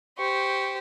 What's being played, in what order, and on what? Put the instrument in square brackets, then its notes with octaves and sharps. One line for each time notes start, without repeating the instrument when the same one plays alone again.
[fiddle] G4 C5 [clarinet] C#6